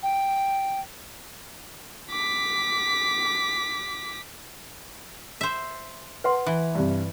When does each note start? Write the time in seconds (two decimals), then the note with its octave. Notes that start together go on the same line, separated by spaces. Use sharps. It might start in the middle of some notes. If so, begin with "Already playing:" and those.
0.02 G5
2.11 D6 B6
5.41 C5 E5
6.24 B4 F#5 C6
6.46 E3
6.75 G2 C3